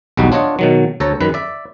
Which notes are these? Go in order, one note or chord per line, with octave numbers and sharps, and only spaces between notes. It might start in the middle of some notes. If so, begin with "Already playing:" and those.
B1 E2 G3 D#4 F#4
D4 F4 C#5 D#5 F#5
B2 D#3 F#3
D2 A4 C#5 A#5
F#2 D#3 B4
D5 E5